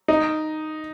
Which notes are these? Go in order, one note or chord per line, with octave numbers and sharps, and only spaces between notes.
D#4